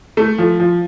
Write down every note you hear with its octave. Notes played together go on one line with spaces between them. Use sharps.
A3
F3
F3